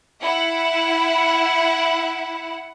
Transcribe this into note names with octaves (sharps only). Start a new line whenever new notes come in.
E4 F#5